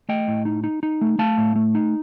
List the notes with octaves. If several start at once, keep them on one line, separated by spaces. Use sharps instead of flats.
A3 D#5 G5
A2
D#4
D#4
D#4
A3
A3 F5 A5
A2
A3
D#4